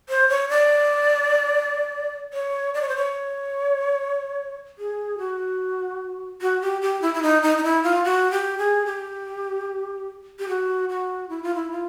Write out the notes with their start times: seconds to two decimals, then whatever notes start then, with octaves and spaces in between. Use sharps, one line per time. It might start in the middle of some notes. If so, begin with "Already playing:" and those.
0.09 C5
0.29 C#5
0.49 D5
2.33 C#5
2.74 D5
2.82 C#5
2.89 C5
2.96 C#5
4.79 G#4
5.18 F#4
6.41 F#4
6.61 G4
6.82 G4
7.02 E4
7.14 E4
7.23 D#4
7.43 D#4
7.58 D#4
7.64 E4
7.83 F4
8.04 F#4
8.31 G4
8.58 G#4
8.86 G4
10.39 G4
10.49 F#4
10.89 F#4
11.29 E4
11.43 F4
11.55 E4
11.71 F4